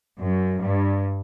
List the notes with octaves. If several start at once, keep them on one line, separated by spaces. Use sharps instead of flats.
F#2
G2